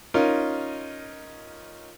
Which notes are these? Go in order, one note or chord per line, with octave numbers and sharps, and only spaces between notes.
C#4 D#4 F4 A#4